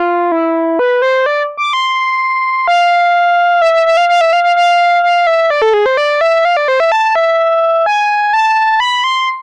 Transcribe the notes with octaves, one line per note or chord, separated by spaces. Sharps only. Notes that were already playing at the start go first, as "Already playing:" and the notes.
Already playing: F4
E4
B4
C5
D5
D6
C6
F5
E5
E5
E5
F5
F5
E5
F5
F5
F5
F5
E5
D5
A4
G#4
C5
D5
E5
F5
D5
C5
E5
A5
E5
G#5
A5
B5
C6